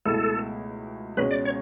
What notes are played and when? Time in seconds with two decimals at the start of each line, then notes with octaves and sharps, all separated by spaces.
0.05 C#2 B2 A3 E4 A4
1.17 C#2 B2 G#3 C#4 B4
1.31 D5
1.45 C#5